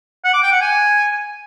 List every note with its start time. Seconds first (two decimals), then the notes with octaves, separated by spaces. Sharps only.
0.24 F#5
0.34 D6
0.43 G5
0.52 F#5
0.61 G#5